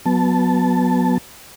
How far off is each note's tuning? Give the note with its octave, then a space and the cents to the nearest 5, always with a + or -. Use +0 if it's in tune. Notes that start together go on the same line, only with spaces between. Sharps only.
F#3 -20 B3 +0 A5 -5